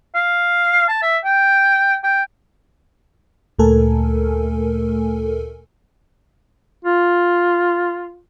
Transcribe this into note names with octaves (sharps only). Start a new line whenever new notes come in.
F5
A5
E5
G5
G5
D2 A#2 A3 A4 A#4 G#5
F4